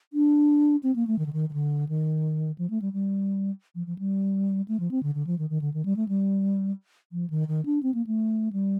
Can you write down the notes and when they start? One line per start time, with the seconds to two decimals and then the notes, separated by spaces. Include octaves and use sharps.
0.13 D4
0.83 C4
0.96 A#3
1.07 A3
1.19 D#3
1.26 D3
1.33 D#3
1.49 D#3
1.53 D3
1.89 D#3
2.58 F3
2.70 A3
2.82 G3
2.93 G3
3.75 F3
3.87 F3
3.99 G3
4.68 A3
4.80 F3
4.91 C4
5.03 D3
5.15 D3
5.27 F3
5.39 D#3
5.50 D#3
5.61 D3
5.74 D#3
5.85 G3
5.96 A3
6.09 G3
7.12 F3
7.30 D#3
7.48 D#3
7.66 D4
7.83 C4
7.94 A#3
8.07 A3
8.53 G3